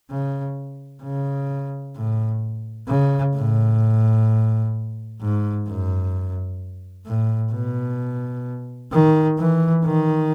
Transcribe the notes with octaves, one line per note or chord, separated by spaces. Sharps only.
C#3
C#3
A2
C#3
A2
G#2
F#2
A2
B2
D#3
E3
D#3